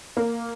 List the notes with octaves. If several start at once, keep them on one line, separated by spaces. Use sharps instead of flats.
A#3